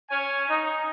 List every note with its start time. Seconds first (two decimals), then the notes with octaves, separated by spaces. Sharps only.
0.10 C#4 C#5 G#5
0.49 D#4